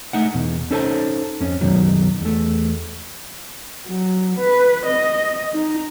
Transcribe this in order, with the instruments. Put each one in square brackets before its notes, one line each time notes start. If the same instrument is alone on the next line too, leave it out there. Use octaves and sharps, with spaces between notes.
[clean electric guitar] A3 D#4 F#5
E2 B2
C#4 D#4 A4 C5 G#5 A5
F2 C#4
C#2 F#2 B2 D#3 F#3
E2 A3
[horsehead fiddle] F#3
B4
D#5
D#4